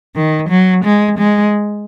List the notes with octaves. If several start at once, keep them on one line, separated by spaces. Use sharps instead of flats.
D#3
F#3
G#3
G#3